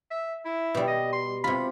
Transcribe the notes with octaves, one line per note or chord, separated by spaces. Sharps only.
E5
E4
B2 G3
D#5
C6
C3 F4 B5